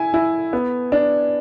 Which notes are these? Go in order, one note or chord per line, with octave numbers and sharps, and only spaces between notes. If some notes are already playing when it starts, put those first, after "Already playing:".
Already playing: E4 G#5
E4
B3
D4